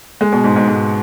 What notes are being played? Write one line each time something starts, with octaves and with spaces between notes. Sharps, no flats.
G#3
B2
G#2
G#2
G#2